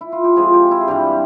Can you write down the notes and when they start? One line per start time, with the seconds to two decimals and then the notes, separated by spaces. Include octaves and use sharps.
0.01 E4
0.12 F4
0.24 G4
0.36 C3 F3 G#3 G#4
0.53 G4
0.71 E4
0.81 G#4
0.87 G2 E3 G3 G4